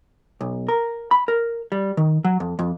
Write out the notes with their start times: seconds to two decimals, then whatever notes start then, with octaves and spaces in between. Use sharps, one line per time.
0.41 B1
0.68 A#4
1.11 B5
1.28 A#4
1.72 G3
1.97 D#3
2.25 F#3
2.40 F2
2.59 F2